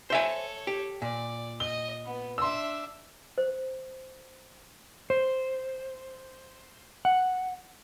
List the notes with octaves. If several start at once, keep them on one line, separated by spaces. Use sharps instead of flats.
A4 C5 C#5 E5 G#5
G4
A#2 D5
D#5 G7
B3
D4 E5 C6 E6
C5
C5
F#5